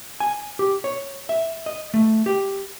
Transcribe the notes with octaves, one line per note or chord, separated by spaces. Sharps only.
G#5
G4
C#5
E5
D#5
A3
G4